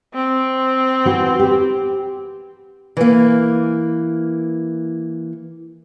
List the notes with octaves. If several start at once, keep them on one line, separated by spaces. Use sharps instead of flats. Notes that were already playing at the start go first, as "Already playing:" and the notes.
C4
E3 F#4
G4
E3 A#3